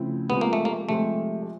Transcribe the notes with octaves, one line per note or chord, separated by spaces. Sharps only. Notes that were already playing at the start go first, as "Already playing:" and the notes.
Already playing: C#3 F3 A3 C4 E4
C3 F3 G#3 B3 C4 F4
A#3
A3
A#3
C3 F3 G#3 A3 C4 F4